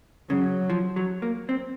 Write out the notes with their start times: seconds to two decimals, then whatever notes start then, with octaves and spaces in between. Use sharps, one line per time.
0.30 C#3 F#3
0.70 F3
0.96 F#3
1.22 A#3
1.49 C4